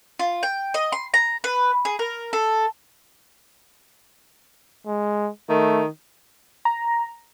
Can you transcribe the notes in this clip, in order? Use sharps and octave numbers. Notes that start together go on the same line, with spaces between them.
F4
G5
D#5
C6
A#5
B4
G#4
A#4
A4
G#3
D#3 A3
A#5